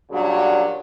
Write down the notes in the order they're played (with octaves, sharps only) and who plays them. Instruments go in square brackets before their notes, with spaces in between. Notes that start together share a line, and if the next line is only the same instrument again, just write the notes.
[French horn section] A#2 C#3 F#3 G3 D4 F#4